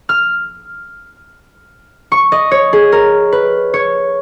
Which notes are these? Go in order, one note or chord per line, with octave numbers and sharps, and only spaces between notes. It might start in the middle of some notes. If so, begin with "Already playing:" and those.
F6
C#6
D#5
C#5
G#4
A#4
B4
C#5